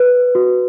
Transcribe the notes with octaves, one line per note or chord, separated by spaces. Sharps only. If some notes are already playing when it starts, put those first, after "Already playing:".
Already playing: B4
F#4